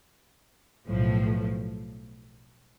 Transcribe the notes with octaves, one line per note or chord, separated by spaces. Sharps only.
B1 A2 F3